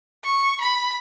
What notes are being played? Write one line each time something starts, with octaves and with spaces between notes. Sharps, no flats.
C#6
B5